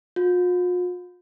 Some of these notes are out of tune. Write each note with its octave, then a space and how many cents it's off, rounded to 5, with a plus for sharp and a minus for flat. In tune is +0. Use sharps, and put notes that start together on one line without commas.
F4 +45